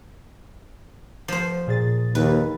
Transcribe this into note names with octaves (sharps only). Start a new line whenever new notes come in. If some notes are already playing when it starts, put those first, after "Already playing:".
F3 C5
A#2 G#4 A6
D#2 B4